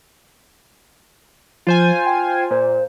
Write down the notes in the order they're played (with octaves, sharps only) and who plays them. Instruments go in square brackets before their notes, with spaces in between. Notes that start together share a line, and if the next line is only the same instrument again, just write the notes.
[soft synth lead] F3 [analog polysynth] F4 C5 G#5
[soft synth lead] G5
[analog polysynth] A#2 [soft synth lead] C5